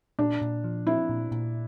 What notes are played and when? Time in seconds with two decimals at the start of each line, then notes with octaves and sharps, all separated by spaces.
0.19 A#2 D4
0.41 A#2
0.64 F3
0.87 C4 E4
1.09 A#2
1.32 A#2